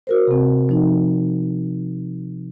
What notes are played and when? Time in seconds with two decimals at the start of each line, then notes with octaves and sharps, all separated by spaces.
0.07 F#4 A#4 C5
0.27 C3 C4
0.69 F3 D#4